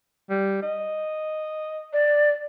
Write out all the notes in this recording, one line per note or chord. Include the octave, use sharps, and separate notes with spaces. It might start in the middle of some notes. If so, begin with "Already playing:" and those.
G3
D#5
D5